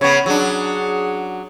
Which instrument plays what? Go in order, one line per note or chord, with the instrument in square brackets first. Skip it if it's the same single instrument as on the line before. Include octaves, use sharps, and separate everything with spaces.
[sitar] C#3 B3 [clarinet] C#5
[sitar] F#3 D4 [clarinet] G#4